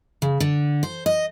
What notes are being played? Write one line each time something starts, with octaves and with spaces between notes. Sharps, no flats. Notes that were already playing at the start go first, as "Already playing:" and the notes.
C#3
D3
C5
D#5